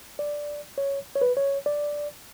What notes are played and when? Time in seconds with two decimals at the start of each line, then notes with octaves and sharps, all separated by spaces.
0.19 D5
0.78 C#5
1.15 C#5
1.21 B4
1.37 C#5
1.66 D5